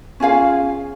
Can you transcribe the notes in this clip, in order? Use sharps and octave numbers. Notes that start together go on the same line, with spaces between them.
C#4 F4 G#4 F5